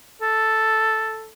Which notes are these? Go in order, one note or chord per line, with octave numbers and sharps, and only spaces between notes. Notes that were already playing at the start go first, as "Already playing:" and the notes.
A4